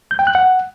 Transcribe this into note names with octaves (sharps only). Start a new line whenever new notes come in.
G6
G5
F#6
F#5